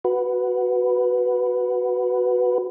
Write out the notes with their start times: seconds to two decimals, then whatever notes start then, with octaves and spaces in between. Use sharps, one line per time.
0.05 F#4 B4